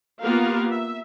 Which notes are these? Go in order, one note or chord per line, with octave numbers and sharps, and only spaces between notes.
A#3 B3 F4 G4 A#4 F5
E5